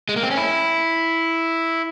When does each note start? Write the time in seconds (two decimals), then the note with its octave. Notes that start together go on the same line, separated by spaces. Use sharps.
0.09 G#3
0.16 A#3
0.23 C4
0.31 C#4
0.38 E4